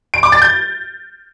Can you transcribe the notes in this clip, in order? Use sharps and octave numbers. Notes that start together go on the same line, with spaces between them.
D7
D6
A6
G6